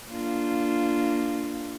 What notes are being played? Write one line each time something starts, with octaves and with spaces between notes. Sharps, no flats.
A#3 D4 F4